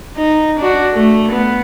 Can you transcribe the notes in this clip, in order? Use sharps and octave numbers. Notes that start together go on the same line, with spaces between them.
D#4
D4 F#4
A3
B3